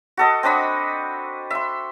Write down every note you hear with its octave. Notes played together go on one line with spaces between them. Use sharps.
F#4 A4 D#5
C4 D4 D#5 B5
E5 C6